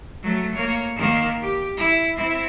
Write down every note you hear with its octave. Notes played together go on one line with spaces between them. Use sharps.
F#3 A3
A#3 C#5
D#3 A#3
G4
E4
C4 E4